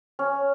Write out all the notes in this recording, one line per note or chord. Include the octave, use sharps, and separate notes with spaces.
C#4